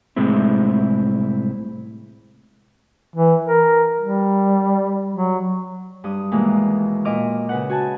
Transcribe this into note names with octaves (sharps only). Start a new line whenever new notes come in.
C2 A2 G#3 C4 E4
E3
A#4
G3
F#3
G2 D#6
D#2 B2 E3 G#3 A#3
A#2 D#5 D6 F6
C#3 B4 F#5
F#4 G#5 A5